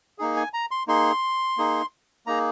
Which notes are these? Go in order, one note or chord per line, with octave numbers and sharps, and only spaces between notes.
A#3 D#4 G#4
G#5
A#5
C6
A#3 D#4 G#4 C6
A#3 D#4 G#4
A#3 D#4 G#4 A#5